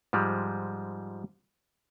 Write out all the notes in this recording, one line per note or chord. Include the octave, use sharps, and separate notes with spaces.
G#2 F3 G3 G#3